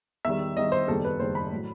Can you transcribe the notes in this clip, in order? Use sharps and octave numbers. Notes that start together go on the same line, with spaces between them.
E2 D#3 G3 E5
E2 D#3 G3 D#5
C5
F#1 E2 D#3 G3 A4
B4
F#1 E2 D#3 G3 C5
B5
A2 F#3